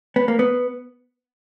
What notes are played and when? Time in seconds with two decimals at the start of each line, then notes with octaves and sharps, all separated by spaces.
0.16 B3
0.28 A#3
0.39 B3